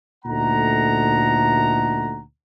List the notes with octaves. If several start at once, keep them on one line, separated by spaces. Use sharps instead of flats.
D2 A#2 A3 D#4 F#5 A#5